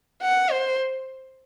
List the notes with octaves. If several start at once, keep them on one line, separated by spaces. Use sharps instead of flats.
F#5
C5